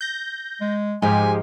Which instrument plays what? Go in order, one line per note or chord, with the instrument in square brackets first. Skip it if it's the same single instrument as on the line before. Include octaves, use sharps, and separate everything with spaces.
[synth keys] G6 A#6
[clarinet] G#3
[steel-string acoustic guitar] G#2 F3 [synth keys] G#3 G4 [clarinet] G#5